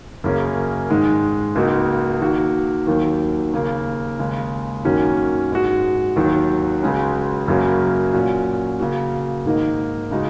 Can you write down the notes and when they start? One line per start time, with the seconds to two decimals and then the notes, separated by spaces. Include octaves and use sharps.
0.24 F#2 C#3 A#3 C#4 G#4
0.90 G#2 D#3 G#3
1.55 C#2 C#3 A#3 D#4 F#4
2.21 D#3 A#3 F#4
2.87 D#2 D#3 F#3 A#3
3.53 D#2 C#3 A#3
4.19 D#2 C#3 G#3
4.85 F#2 D#3 A#3 C#4 F#4
5.51 G#2 G#3 F#4
6.16 D#2 D#3 F#3
6.83 C#2 C#3 G#3 C#4 F#4
7.48 F#2 C#3 F#3 A#3 C#4
8.14 A#2 F#3 C#4 F#4
8.80 C#3 A#3 F#4
9.45 G#2 D#3 A#3 D#4
10.11 C#3 G#3 D#4 F#4